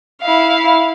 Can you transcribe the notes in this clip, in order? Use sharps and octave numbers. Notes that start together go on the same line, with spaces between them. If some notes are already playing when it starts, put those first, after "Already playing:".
E4 F5